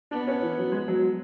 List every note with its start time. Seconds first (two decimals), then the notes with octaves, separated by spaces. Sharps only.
0.11 B3 D4
0.28 C#4
0.42 E3
0.58 F#3
0.72 G#3
0.88 F#3